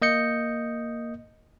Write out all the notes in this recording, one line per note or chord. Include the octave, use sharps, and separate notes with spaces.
A#3 D#5 G6 C#7